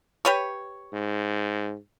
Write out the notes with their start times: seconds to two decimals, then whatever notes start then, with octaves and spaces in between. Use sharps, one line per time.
0.25 G4 B4 C#5
0.93 G#2